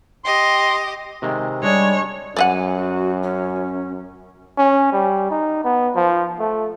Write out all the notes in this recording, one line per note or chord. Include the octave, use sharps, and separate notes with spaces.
G4 D#5 C6
C3 D#3 G#3
G3 G#3 D4 G#4 C#5
F#2 D5 D#5 F#5 G#5
F#4
C#4
C#4
G3
D#4
B3
F3
A3